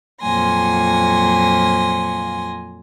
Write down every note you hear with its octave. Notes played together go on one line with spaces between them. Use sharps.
F2 A#2 F#3 G#5 C6 A#6